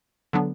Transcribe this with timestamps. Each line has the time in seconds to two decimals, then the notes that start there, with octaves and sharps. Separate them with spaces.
0.33 D3 F#3 B3 D4